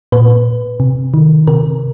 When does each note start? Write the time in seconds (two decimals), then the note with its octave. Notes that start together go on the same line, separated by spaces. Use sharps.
0.12 A#2 B4
0.80 C3
1.14 D#3
1.47 C3 A#4